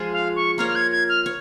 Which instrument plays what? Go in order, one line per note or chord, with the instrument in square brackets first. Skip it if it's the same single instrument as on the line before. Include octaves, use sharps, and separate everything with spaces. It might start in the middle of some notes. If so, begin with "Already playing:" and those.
Already playing: [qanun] F3 G#3 F4 G#4
[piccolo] F5
C#6
[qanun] A#3 F4 A#4 C#5 [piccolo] F6
[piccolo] F6
G#6
G#6
F6
[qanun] C#5